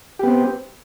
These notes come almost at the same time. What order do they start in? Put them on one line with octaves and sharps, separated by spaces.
G4 B3 C4